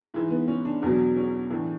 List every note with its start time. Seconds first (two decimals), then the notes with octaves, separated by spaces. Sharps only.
0.14 G#2 E3 E4
0.31 B3
0.48 C#4
0.65 D4
0.82 E2 B2 F#3 D4
1.17 C#4
1.50 A2 E3 D4